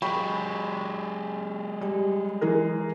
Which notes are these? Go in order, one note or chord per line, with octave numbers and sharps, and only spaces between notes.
F#3 G#3 G5 B5 C#6
G3
E3 G#4 A#4